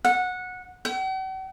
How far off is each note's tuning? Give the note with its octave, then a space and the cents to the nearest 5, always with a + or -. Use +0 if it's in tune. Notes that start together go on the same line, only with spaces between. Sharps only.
F#5 -15
F#5 +45